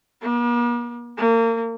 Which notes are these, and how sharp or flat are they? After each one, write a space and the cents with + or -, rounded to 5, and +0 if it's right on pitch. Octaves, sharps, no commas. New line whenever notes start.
A#3 +45
A#3 -30